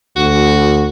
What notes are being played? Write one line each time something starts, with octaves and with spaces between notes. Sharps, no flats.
D2 F#4